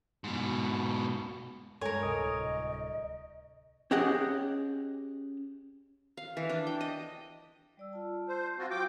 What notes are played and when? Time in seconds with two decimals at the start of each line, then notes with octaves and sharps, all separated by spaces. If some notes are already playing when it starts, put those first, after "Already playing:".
0.24 G#2 B2
1.81 G2 G#3 A4 A#4 C#5 G#5
2.03 D1 C2 D#5 D#6 D7
3.91 C#4 G4 G#4 D#5 F#5 G5
6.17 F5
6.37 E3
6.50 D4
6.67 G5
6.81 D#5
7.77 G3 D5 E6
7.93 F4 A5
8.28 C5
8.58 C4 F4 F#4
8.71 F#3 G4 G5 D6 D#6